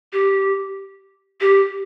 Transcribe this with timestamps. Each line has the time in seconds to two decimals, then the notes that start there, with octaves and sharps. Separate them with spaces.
0.13 G4
1.41 G4